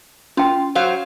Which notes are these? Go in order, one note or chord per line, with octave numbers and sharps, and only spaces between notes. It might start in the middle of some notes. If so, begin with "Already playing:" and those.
C#4 F4 G5
F#3 C5 F5